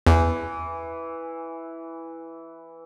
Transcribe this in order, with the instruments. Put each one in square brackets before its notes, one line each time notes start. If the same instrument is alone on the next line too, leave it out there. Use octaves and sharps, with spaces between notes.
[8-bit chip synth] E2 [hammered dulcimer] E3